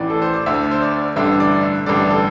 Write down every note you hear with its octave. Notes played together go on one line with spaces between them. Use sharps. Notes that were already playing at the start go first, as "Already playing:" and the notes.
Already playing: A1 A2 E3 D5
A4
C5
D5
D2 D3 E5
C5
D5
A1 G2 D3 E5
D5
E5
A1 G2 D3 D5
A4